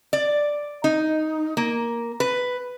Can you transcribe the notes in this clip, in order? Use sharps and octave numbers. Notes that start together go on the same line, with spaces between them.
D5
D#4
A#3
B4